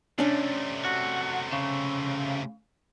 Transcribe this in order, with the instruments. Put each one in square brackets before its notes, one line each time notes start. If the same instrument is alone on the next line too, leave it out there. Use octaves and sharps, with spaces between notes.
[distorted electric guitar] C3 A3 [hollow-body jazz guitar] C#4 D4
[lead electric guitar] F#4
C#3